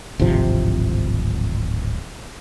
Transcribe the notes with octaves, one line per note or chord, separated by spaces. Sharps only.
D1 G#1 C3 F3